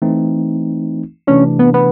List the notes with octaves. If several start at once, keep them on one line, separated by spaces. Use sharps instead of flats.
E3 A3 C4 D#4
C3 E3 A3 C#4 D4
B3
B3